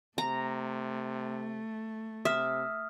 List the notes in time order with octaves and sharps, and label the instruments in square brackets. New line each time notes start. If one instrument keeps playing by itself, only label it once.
[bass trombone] C3 [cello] A3 [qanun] A#5
[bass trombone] C3 [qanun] E5 [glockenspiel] D#6 F6